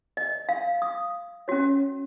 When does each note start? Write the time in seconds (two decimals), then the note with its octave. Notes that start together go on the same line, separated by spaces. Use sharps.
0.17 D#5
0.49 F5
0.82 D#6
1.48 C#4 F#4 C#5